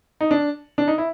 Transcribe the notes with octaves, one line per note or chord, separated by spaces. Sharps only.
D#4
D4
D4
D#4
E4